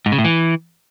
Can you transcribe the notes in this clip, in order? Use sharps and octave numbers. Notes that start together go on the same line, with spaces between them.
G#2
C#3
A2
E3